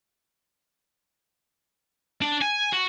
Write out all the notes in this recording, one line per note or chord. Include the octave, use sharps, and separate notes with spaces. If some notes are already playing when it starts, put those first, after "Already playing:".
D4
G#5
F#4